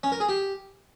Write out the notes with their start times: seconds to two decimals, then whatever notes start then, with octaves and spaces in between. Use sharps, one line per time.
0.03 C#4
0.12 A#4
0.20 G#4
0.29 G4